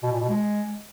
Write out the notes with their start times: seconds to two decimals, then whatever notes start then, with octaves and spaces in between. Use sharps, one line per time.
0.03 B2
0.12 A#2
0.20 B2
0.29 G#3